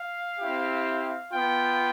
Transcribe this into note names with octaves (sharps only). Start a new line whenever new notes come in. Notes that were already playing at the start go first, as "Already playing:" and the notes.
Already playing: F5
C4 E4 G4
B3 F4 G5